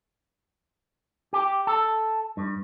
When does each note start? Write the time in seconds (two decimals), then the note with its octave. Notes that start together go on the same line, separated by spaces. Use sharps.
1.33 G4
1.67 A4
2.37 G2